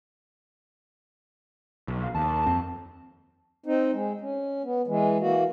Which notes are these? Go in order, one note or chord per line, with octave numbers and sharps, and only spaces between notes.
B1
F5
D#2 A5
F2 C4
C4 D#4
G#3
C#4
B3
E3 G#3
E3 A#3 F#4